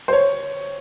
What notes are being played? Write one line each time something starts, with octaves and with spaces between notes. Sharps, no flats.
C5
C#5